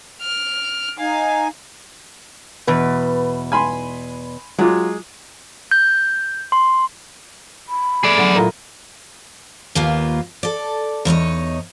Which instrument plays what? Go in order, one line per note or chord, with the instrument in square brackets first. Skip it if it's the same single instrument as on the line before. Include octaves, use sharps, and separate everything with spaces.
[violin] F6 D7
[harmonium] D#4 G#5 [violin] F5
[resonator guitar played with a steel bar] E2 B2 B4
[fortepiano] G#5 B5 C6
[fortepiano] F#3 F4 D6 [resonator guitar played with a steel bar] G#3
[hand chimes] G6
C6
[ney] B5
[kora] A3 [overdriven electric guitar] G#4 D5
[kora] D3 [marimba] F#3
[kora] A#2 E4 D#5 [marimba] A4 A#4 A#5
[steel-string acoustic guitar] D#2 A#3 B3 F4
A4 D5
E2 D#4 C#5 D#5